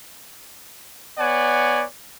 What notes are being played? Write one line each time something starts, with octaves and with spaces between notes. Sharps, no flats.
B3 C#5 D5 F#5 G#5